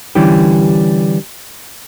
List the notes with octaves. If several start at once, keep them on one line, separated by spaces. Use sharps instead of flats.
D3 E3 G3 C#4 G4